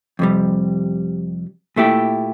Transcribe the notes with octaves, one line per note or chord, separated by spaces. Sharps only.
F2 C3 G3
A#2 A3 E4 G4